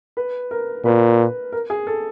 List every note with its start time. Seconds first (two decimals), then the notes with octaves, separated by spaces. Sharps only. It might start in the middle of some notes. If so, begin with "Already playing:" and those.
0.17 B4
0.51 A#4
0.85 A#2 B4
1.52 A#4
1.70 G#4
1.87 A4